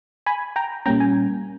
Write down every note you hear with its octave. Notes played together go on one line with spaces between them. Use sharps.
G#5 B5
G5 A#5
A#2 G3 A#3 C#4 G5 A#5
G#5